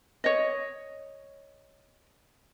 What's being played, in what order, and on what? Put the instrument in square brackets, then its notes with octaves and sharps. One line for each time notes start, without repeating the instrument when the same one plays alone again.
[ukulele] C#5 D#5